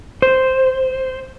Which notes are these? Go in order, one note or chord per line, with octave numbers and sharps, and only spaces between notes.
C5